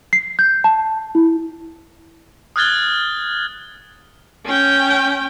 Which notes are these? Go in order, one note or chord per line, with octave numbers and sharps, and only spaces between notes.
C7
G6
A5
E4
D#6 F6 F#6 G#6 A6 G7
C#4 G5